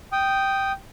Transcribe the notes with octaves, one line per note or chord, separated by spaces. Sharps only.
G5 D#6